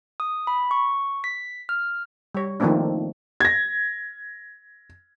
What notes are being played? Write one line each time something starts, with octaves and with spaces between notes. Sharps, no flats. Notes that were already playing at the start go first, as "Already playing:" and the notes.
D#6
B5
C#6
B6
F6
G3 C#5
D#3 F3 A3 A#3 C4 D4
G#6 A#6